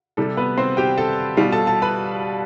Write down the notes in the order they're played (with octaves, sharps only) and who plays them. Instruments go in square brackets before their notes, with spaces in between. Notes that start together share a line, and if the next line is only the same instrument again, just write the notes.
[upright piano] C3 G3 A4
B3 B4
C4 C5
G4 G5
A4 A5
B2 G3 F4 F5
A4 A5
A4 A5
B4 B5